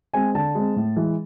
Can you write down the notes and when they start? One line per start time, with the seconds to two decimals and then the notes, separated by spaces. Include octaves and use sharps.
0.14 G#3 C4 G#5
0.35 D3 A5
0.55 G#3 C4
0.76 A2
0.96 E3 G#3